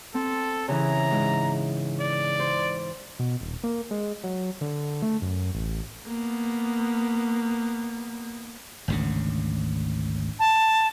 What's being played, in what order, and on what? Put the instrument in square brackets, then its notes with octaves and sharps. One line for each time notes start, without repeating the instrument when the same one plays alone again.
[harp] C4 [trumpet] A4
[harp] C#3 E3 [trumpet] A#5
[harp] G#2
[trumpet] D5
[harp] C5
[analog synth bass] B2
D#1
A#3
G#3
F#3
D3
A3
F#2
A1
[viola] A#3 B3
[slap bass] G#1 D2 C#3
[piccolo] A5